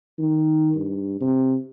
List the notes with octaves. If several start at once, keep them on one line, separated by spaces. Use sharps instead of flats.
D#3
G2
C3